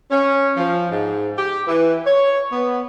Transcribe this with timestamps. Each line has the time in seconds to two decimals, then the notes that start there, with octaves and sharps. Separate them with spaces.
0.10 C#4
0.57 F3
0.91 G#2
1.38 G4
1.67 E3
2.06 C#5
2.52 B3